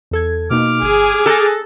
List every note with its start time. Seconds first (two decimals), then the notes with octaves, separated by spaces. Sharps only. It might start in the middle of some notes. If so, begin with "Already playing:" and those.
0.11 E2 A4 G#6
0.50 B2 A#3 D#4 D6 F6
0.82 G1 G#4
1.26 A4 F#6 A6 A#6